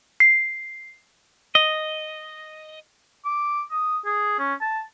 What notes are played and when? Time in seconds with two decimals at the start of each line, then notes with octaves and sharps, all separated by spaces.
0.20 C7
1.55 D#5
3.25 D6
3.71 D#6
4.06 G#4
4.39 C#4
4.61 A5